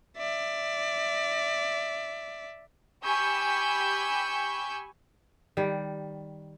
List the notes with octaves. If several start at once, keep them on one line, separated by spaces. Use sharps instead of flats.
D5 E5
G4 G#5 B5 C#6 E6 G6
D#3 G3